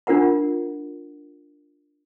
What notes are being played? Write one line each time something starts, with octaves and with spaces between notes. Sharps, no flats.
D4 F4 A#4 F#5 A#5